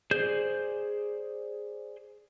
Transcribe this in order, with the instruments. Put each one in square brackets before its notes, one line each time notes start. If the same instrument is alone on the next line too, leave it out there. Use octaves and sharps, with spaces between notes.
[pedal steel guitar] G#4 C5 D5 G6